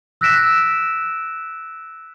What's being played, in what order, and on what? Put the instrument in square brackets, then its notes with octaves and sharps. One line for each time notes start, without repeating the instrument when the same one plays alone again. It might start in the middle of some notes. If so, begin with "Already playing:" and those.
[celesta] E6 F#6 A#6 B6 D7 E7